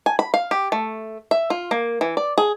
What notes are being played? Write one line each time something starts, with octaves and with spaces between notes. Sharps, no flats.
G#5
B5
F5
G4
A3
E5
F4
A#3
E3
D5
G#4